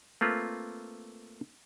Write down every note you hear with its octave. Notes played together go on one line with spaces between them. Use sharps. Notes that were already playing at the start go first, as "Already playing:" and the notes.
A3 A#3 C4 F4 B4